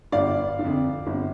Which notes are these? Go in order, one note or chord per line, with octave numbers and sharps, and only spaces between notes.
G1 D5 F5
D3
F2
G1